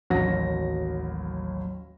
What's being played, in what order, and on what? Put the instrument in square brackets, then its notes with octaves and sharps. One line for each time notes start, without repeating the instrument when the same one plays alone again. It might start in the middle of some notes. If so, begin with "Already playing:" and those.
[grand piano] A1 D#2 A#6 [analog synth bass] F#3